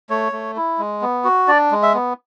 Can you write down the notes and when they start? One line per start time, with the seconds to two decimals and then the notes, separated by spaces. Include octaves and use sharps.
0.10 A3 C#5
0.32 A3
0.56 E4
0.79 G#3
1.02 B3
1.25 F#4
1.48 D4 D5
1.71 G#3
1.83 E5
1.94 B3